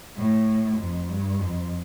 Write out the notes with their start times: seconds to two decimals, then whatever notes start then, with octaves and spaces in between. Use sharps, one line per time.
0.16 A2
0.77 F2
1.08 G2
1.39 F2